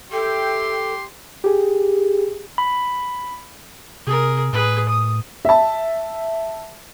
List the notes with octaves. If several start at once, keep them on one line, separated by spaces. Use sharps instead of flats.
G4 A4 E5 G5 C6
G4 G#4
B5
C3 G#4 A#4
A2 G#4 B4
D#6
E5 A5